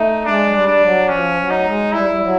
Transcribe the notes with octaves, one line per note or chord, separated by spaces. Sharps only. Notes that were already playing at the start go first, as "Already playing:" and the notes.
Already playing: A3 D#4
G#3 D4
F#3
G3
D4
F#3
F3 C#4
F#3
D#4
A3
G#3
G3 E4
G3
F#3